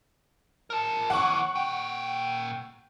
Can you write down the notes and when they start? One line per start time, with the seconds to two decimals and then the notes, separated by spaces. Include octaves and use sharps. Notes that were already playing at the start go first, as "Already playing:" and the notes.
0.70 A#4 A5
1.10 D#2 E3 F#5 C#6
1.55 A#2 G5